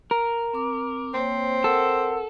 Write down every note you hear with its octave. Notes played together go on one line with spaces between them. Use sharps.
A#4
C4 D6
A#3 C4 C5 C#5
A4 A#4 F#5 E6